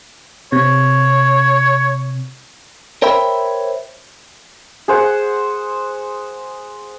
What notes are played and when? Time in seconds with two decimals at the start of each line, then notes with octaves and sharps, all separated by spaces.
0.52 C3 C#5
3.02 A#4 C5 C#5 E5 G5 B5
4.88 G#4 C5 F#5